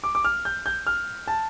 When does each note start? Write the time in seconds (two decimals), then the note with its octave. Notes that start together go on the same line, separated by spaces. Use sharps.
0.04 D6
0.15 D6
0.25 F6
0.45 G6
0.66 G6
0.87 F6
1.28 A5